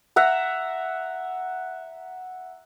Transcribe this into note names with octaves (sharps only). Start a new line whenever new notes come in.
E5 F#5 A#5